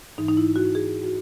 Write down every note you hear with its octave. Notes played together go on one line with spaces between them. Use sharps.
G#2 E3 D#4
D#4
E4
F#4
G#4
F#4